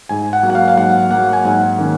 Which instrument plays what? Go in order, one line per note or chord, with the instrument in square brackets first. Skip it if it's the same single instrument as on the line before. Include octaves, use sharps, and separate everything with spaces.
[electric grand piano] G#2 G#5
F#5
F#3 A#3
F#5
F5
F5
G#2 F#5
F#3 A#3 F#5
G#5
G#2 F#5
D#3 A#3 C#4